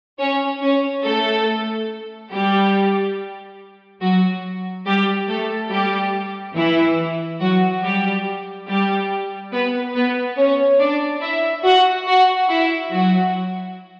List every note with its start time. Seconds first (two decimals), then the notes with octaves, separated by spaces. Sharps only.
0.19 C#4 C#5
0.61 C#4 C#5
1.04 A3 A4
2.31 G3 G4
4.01 F#3 F#4
4.85 G3 G4
5.28 A3 A4
5.70 G3 G4
6.55 E3 E4
7.40 F#3 F#4
7.82 G3 G4
8.67 G3 G4
9.52 B3 B4
9.94 B3 B4
10.37 C#4 C#5
10.79 D4 D5
11.21 E4 E5
11.64 F#4 F#5
12.07 F#4 F#5
12.49 E4 E5
12.91 F#3 F#4